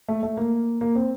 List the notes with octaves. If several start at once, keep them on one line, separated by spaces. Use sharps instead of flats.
A3
A3
A#3
A#3
C4